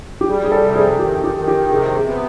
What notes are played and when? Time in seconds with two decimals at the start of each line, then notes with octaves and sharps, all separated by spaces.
0.21 G4
0.28 G3 G#4
0.44 G#4
0.52 A4
0.63 C3
0.76 G#4
0.99 D#3 G4
1.24 G4
1.36 D#3
1.48 G4
1.71 C3 G#4
1.95 G#4
2.07 B3